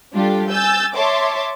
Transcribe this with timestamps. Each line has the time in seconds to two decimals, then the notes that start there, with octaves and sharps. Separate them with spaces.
0.13 G3 D4 F4 G4 A4
0.49 G#5 E6 G6 A6
0.95 C#5 E5 A5 C6 D6